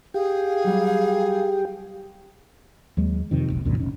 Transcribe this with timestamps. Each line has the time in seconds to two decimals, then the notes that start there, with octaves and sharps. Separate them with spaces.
0.14 G4 G#4 F5
0.64 F#3 G3
2.97 D#2 F#3 G#3
3.31 F2 C3 D#3
3.50 F1 B1
3.65 C2 F#2 A#2 D3
3.78 F1 D#3 C#4